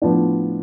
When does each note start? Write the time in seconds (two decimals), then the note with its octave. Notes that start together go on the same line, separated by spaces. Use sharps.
0.02 A2 F3 B3 D4